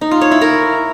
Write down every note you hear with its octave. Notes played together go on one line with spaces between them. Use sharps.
D#4
F4
C#5
E4
A#4